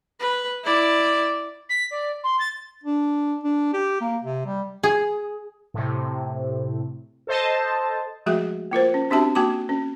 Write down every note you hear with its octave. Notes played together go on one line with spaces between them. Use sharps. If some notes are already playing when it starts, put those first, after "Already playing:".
B4
E4 D5
B6
D5
C6
A6
D4
D4
G4
A#3
C3
G3
G#4
A2 C3
A4 C5 D#5 A5
F3 G#3 A3 F#4 G#4 E5
A#3 F4 A#4 C5
C#4
C4 D4 F#4 G4 E5 A5
A#3 F#4 G#5 A5 D6
C#4